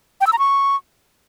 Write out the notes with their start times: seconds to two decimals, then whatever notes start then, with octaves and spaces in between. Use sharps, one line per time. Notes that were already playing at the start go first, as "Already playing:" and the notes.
0.21 G5
0.27 E6
0.33 A#5
0.39 C#6